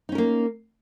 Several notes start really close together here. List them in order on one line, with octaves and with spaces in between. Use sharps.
D#4 C#4 A#4 A#3